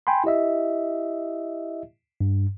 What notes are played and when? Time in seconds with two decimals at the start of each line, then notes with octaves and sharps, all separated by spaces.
0.07 G5 G#5 B5 C6
0.24 E4 G4 D#5 E5
2.21 G2